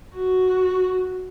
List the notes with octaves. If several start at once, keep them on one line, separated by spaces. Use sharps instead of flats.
F#4